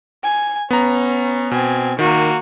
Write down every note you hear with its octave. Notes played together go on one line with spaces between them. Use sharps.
G#5
B3 C#4 A#5
B2 C4 G#5
D#3 A#3 F#4